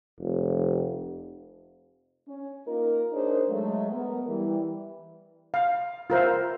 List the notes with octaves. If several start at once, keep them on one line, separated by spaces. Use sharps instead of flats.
F1
C#4
A#3 D#4 F4 A#4
D4 D#4 G#4 A#4 C5 C#5
F#3 G#3 A3
B3 A#4
E3 G3
F5
F4 A#4 C5 E5